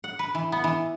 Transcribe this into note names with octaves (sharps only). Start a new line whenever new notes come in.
F#5
B4
E3
B3
E3